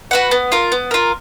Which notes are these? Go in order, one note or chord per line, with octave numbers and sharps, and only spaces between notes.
F#4 B4 F#5
B3
F4 A#4
B3
F4 A#4